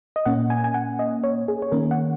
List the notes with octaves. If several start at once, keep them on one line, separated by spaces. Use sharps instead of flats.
D#5
A#2 A#3 C#4 F#5
G#5
G#5
F#5
D#5
C#5
G#4
C#5
D#3 A#3 C#4 A#4
F#5